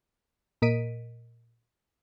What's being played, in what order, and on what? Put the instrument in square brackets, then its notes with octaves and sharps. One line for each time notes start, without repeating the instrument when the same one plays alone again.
[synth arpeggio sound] A#2 A#4 D#5 B6 D7 D#7